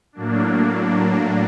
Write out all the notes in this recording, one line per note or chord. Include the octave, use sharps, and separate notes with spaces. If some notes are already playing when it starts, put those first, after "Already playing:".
A2 F#3 A#3 D4